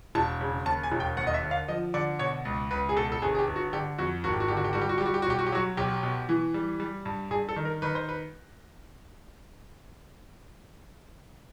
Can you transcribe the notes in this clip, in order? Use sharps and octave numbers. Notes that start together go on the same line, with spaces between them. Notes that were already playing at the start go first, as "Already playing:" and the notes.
E1 A5
C#3
D#2 A5
G#5
E1
G5
D#2 F#5
D#5
E5
D3
F5
F3 D#5
D3 D5
B2 C#5
C#2
C#2 B4
G#4
B2 A4
A4
G1 G#4
G#4
G4
G1
F#4
D3 G4
F2 F#4
G#1 F#4
G4
F#4
D3 G4
F#4
G4
G3 F#4
G4
F#4
G3 G4
F#4
G4
F#4
B1 G4
F#4
G4
F#3 F#4
B1 G4
B2
E3
G3
G3
G2
G2 G#4
A4
D#3
A#4
D#3 B4
C5
B4